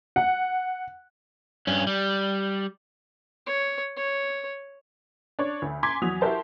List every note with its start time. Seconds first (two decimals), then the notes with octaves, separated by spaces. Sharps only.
0.16 F#5
1.67 G2 C#4
1.87 G3
3.47 C#5
3.97 C#5
5.39 D4 C#5
5.62 D2
5.83 G#5 A#5 C6 D6 G#6 B6
6.02 E2 F#3 D#6 F7
6.21 E4 F#4 G4 A#4 C5 A5